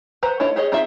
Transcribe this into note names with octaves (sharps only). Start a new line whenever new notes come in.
B4 C5 F#5 A#5
A3 E4 F4 C#5 D#5
G4 G#4 C#5 D#5
C4 D#4 F4 G#4 E5